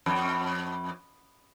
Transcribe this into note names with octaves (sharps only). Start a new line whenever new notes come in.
F2